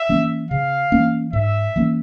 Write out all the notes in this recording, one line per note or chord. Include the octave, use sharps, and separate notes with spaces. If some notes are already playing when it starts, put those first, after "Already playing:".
Already playing: E5
E3 A#3 C#4
C#3 F5
E3 A#3 C#4
G#2 E5
E3 A#3 C#4